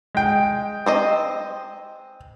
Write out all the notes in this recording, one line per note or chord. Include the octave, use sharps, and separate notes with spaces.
G#3 G5
C4 C5 D#5